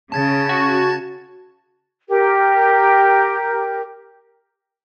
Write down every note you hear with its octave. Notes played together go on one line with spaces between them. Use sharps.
C#3 A5 G#6 A6
F#4
G4 A#4